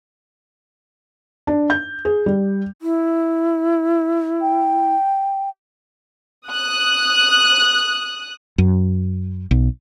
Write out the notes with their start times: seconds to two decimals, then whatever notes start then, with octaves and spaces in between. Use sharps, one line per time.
1.47 D4
1.70 G6
2.05 G#4
2.26 G3
2.82 E4
4.41 G5
6.48 D#6 F#6
8.58 F#2
9.51 B1